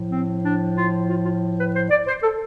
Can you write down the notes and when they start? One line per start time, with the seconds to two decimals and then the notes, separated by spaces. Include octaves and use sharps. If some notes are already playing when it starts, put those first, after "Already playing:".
Already playing: A2 F3
0.11 C4
0.44 D4
0.77 F4
1.09 F4
1.25 F4
1.58 B4
1.75 C5
1.90 D5
2.07 C5
2.23 A4